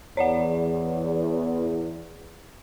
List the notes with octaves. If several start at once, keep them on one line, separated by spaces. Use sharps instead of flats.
E2 C#5 D5 F#5